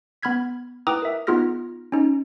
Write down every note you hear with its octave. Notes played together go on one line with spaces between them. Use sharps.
B3 B5 F6 G#6 B6
E4 B4 G5 A#5 D6 D#6
A#4 E5
B3 D#4 F4 G#4 F6 A#6
C#4 D#4